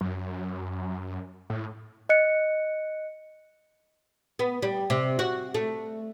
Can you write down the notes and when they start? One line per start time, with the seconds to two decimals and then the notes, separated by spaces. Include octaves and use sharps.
0.01 F#2
1.50 A2
2.09 D#5 F#6 C#7
4.39 B3
4.62 G3
4.90 C3
5.19 F#4
5.54 A3